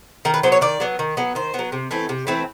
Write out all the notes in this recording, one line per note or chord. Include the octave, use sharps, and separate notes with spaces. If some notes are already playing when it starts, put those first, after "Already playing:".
D#3 A#4
B4
F#3 B3 C5
C#5
D#3 D5
F#3 B3
D#3
F#3 B3
D#3 C5
F#3 B3
C3
E3 A3 C4
C3
E3 A3 C4